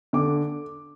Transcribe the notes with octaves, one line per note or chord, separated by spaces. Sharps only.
D3 D6